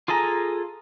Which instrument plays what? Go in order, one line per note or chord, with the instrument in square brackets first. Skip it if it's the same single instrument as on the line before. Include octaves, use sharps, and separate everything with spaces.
[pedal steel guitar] F4 G#4 A4 G#5 A#5